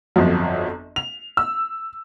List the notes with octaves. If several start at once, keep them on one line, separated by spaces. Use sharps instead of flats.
G1 F2 F3 F#3
F7
E6